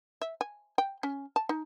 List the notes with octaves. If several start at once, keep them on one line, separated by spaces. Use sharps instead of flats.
E5
G#5
G5
C#4
A5
D#4